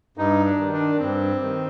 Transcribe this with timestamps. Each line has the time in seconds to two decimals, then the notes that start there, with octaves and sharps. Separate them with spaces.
0.17 G2 D#4
0.45 D4
0.59 D#3
0.73 D4
0.99 G2 C4
1.41 D#3